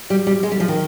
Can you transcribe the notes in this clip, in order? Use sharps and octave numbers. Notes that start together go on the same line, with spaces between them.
G3
G3
G#3
G3
F3
D#3